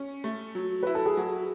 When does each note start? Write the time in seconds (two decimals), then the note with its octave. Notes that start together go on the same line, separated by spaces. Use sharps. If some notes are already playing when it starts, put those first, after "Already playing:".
Already playing: C#4
0.24 A3
0.55 F#3
0.83 E4 B4
0.95 A4
1.06 G#4
1.17 F#3 F#4